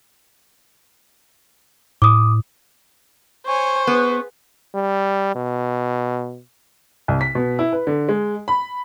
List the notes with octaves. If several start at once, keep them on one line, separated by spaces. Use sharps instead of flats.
A2 D6 D#6
C5 C#5 G#5 C#6
B3 G#4 B4
G3
B2
C2
B6
B2
E4
B4
D3
G#3
B5